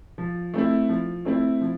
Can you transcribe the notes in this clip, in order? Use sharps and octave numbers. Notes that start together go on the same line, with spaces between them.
F3
A3 C4 E4
F3
A3 C4 E4
F3